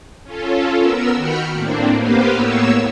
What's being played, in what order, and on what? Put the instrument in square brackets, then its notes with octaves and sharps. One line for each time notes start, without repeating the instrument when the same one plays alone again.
[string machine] C#4 F4 A4
B3 A#4 E6
D#3 F#4 G5 B5 F6 C#7
A2 A#3 C4 D4
A#3 B3 G4 B4 C5 F5
A2 A#3 B3 C#5 E6